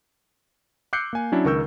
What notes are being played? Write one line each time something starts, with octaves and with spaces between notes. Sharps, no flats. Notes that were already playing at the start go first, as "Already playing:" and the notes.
D6 E6 F#6 G6 C7 C#7
A#3 G#5
F#3 C#4 D4 E4
C#2 D#3 A#4 C#6 E6 G6